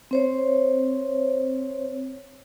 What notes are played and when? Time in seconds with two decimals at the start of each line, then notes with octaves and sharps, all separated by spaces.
0.11 C4 C5 C#5